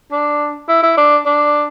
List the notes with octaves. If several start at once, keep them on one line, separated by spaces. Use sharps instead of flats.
D4
E4
E4
D4
D4